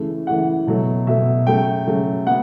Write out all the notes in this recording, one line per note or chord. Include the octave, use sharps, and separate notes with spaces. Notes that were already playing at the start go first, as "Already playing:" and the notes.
Already playing: C#3 E3 A3
C#3 E3 A3 F#5
B2 F#3 A3
B2 F#3 A3 E5
C#3 F#3 A3 G5
C#3 F#3 A3
B3 F#5